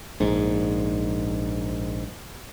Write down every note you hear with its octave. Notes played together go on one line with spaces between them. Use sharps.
A#1 G#2